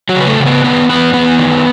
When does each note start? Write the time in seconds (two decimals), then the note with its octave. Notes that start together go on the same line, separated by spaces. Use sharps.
0.09 F#3 F#4
0.16 C#3
0.21 B4
0.27 A3 A4
0.40 C#3
0.46 B3 B4
0.64 D#3 B3 B4
0.89 E2 B3 B4
1.13 E2 B3 B4
1.39 D#3